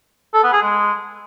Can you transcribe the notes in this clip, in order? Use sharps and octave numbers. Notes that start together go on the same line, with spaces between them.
A4
B3
G#4
G#3